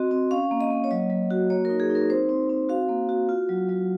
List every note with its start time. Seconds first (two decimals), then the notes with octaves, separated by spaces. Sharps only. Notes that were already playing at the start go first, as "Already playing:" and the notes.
Already playing: C4 F#4 D#5
0.11 C4
0.31 C#4 F5
0.51 A#3
0.61 D#5
0.71 A#3
0.84 C#5
0.91 F#3 D#5
1.10 F#3
1.31 F#4
1.50 A#3 C#5
1.65 D#4 A#4
1.80 G#4
1.90 D#4
1.95 A#4
2.09 C4 C5
2.29 C4
2.50 C4
2.69 F#4 F5
2.89 A#3
3.09 F#4
3.29 F4
3.49 F#3
3.69 F#3